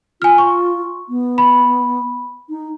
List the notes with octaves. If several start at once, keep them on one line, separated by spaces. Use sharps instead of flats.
F4 G#5 F6
C#6
B3
B5
D#4